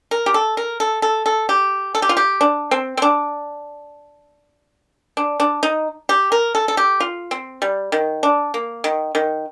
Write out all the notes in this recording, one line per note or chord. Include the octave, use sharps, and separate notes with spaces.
A#4
G4
A4
A#4
A4
A4
A4
G4
A4
G4
F4
G4
D4
C4
C4
D4
D4
D4
D#4
G4
A#4
A4
A4
G4
F4
C4
G3
D#3
D4
A#3
D#3
D#3